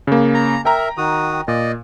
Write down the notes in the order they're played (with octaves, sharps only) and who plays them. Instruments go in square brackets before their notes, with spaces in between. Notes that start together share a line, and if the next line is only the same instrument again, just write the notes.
[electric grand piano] C#3 A#3
[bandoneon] A#5
[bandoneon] A#4 E5 [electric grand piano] G5 A#5
[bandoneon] D#3 F#4 D#6
[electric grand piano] A#2 [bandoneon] D5 D#5